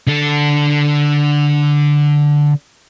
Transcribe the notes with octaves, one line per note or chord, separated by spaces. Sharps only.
D3 A4